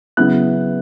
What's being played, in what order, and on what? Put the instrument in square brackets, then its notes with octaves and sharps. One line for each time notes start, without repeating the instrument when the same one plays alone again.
[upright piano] C#3 F#3 B3 E4 F#6